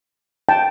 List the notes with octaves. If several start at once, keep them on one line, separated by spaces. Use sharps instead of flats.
G5 A5